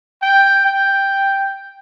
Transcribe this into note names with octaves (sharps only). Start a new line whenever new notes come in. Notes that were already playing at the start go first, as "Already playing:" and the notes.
G5
G5